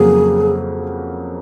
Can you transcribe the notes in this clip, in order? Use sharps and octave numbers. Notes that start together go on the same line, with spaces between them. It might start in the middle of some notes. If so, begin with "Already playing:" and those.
Already playing: F2 C#3 F#3 A#3 G#4